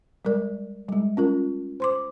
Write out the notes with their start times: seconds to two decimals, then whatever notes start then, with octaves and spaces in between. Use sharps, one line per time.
0.25 G3 G#3 A#4 D5
0.89 G3 G#3
1.17 C#4 F4 A#4
1.80 C5 C6 D6